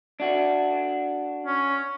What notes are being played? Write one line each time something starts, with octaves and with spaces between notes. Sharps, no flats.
D4 F#4
C#4